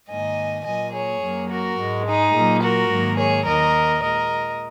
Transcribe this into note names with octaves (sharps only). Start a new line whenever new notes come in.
G#2 D#3 A#3 D#5 G#5
A#2 F#3 A#3 D#5 G#5
G#4 C#5
F#2 F#3 A#3
F#4 A#4
G#2 G#3
D#4 G#4
A#2 F#3 A#3
F#4 A#4
G#2 D#3 F#3 A#3
G#4 C#5
D#2 D#3 A#3 A#4 D#5
A#2 G#3 A#4 D#5